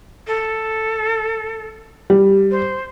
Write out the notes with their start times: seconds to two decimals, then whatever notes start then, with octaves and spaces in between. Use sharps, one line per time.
0.27 A4
2.10 G3
2.51 C5